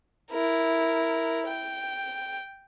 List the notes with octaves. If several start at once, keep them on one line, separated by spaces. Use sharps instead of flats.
E4 A#4
G5